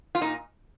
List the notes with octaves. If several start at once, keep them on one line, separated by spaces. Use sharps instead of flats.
F4
A#2 D#4